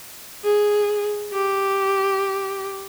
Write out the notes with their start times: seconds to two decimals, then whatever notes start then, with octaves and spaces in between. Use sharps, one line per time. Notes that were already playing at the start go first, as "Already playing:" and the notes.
0.44 G#4
1.33 G4